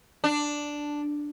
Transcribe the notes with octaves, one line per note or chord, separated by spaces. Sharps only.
D4